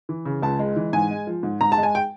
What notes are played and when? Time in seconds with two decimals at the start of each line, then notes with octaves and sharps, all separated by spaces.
0.09 E3
0.25 C#3
0.42 C#2 A5
0.59 G#3
0.76 E3
0.93 G#2 G#5
1.10 G#3
1.27 F3
1.43 G#2
1.61 G#2 A#5
1.72 A5
1.78 G#3
1.83 G#5
1.95 G5